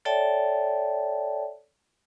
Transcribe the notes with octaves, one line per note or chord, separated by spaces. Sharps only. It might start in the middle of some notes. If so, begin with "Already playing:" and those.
A4 C#5 D5 E5 G5 A5